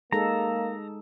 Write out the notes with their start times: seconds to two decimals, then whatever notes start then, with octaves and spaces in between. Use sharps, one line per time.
0.13 G#3 A#3 D#4 A4 A#5